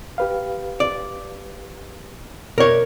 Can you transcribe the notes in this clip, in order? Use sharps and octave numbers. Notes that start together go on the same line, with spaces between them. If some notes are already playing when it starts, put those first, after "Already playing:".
G4 B4 F5
D5
B2 A#4 C#5 D5